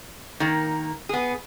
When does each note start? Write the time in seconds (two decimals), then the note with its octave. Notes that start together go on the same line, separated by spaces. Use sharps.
0.40 D#3 A#3
1.09 B3 G#4